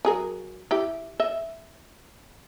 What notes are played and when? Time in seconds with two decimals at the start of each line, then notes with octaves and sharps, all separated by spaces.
0.05 F#3 G#4 A#4
0.71 E4 G4
1.20 D#5 E5